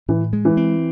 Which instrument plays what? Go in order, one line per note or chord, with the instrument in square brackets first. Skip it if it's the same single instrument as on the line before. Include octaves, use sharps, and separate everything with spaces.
[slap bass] A2 [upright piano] E3
[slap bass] G#3
[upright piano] E3
[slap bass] C4